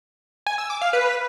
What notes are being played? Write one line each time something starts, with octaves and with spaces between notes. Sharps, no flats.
G#5
E6
D6
F5
B4